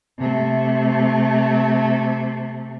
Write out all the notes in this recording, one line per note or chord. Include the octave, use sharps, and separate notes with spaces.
C3 A3